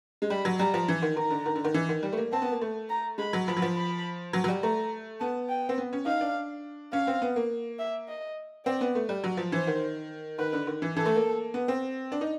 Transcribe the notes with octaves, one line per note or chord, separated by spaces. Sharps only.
G#3
G3 B5
F#3
G3 A#5
F3
E3
D#3
D#3 A#5
D3
D#3
D3
D#3
E3
D#3
G3
A3
A#3
C4 A5
B3
A#3
A3
A#5
G#3 B5
F#3
F3 B5
F#3
F3
B5
F#3
F#3
G3
A3 A#5
B3 A5
G5
C4
B3
C#4
D#4 F5
D4
C#4 F5
C4
B3
A#3
E5
D#5
C4 D5
B3
A3
G3
F#3
F3
E3 C5
D#3
D#3 B4
D3
D#3
E3
E3 A4
A3
A#3
B3
C4
D4
D#4